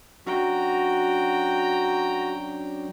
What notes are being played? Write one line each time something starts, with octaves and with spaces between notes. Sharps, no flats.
F#3 C#4 D4 F#4 G5 A#5